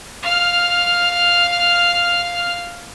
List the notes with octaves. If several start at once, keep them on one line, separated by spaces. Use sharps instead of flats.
F5 F6